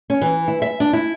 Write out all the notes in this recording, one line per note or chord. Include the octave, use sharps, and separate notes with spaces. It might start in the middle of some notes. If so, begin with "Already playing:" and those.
C#4
E3
E4
E5
D4
E4